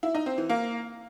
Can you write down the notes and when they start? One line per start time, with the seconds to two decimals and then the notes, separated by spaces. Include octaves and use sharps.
0.03 E4
0.15 D#4
0.26 C4
0.38 E3
0.49 A#3